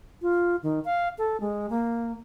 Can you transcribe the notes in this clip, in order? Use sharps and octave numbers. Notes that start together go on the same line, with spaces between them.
F4
D#3
F5
A4
G#3
A#3